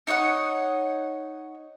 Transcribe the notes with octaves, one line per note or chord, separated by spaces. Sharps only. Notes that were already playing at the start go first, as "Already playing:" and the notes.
D#4 C#5 D#5 F#5